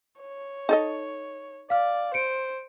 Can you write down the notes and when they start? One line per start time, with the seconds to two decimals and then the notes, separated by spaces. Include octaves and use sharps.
0.20 C#5
0.69 D#4 A4 D#5
1.70 D5 F5 F6
2.14 C5 C#7 D7